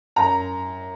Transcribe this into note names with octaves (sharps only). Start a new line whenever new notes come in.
F#2 A#5